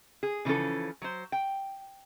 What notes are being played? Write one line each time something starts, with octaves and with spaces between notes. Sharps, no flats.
G#4
C#3 E3 F3 A3 C#4 A4
F#3 C5
G5